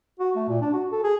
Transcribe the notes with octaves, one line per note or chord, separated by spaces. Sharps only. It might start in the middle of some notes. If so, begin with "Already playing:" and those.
F#4
A3
A#2
D4
F#4
A4
G#4